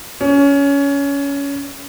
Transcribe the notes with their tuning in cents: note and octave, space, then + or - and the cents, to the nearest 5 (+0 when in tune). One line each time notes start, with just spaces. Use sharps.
C#4 +20